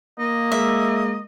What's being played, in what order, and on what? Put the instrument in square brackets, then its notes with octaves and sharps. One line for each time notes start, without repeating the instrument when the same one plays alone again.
[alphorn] A#3 [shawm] D#5
[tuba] G#3 [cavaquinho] E5